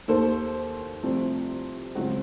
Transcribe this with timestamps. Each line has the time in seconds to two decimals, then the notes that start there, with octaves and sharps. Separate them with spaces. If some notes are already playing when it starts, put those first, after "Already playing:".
0.08 D#2 D#3 A#3 A4 C5
1.02 C2 C3 F3 A3 C4
1.95 C#2 C#3 F#3 C4 F#4